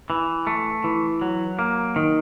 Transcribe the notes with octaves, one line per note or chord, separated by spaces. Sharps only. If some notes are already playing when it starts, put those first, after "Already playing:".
E3
A3
E3
F#3
A#3
D#3